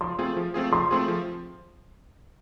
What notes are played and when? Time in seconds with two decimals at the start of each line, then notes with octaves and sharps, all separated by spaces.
0.01 F3 C6
0.18 A3 C4 F4 G#4
0.37 F3
0.54 A3 C4 F4 G#4
0.72 F3 C6
0.91 A3 C4 F4 G#4
1.08 F3